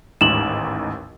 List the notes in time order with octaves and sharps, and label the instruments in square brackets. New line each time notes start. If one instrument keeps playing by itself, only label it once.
[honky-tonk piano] A1 D#2 G#2 [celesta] E7 F#7